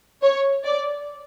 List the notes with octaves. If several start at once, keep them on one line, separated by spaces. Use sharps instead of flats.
C#5
D5